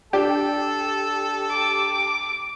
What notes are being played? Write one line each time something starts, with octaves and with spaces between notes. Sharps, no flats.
D4 G4 A4
D6